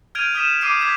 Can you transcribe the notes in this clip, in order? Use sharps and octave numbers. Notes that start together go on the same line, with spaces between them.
F6 G6 G#6 D7 D#7 F7
D#6 F6 G6 B6 D#7 E7
D6 F6 G6 C7 D7 D#7
D6 G6 G#6 B6